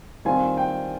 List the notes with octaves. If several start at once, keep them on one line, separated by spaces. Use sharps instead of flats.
D#3 G3 C4 F4 G#5
G5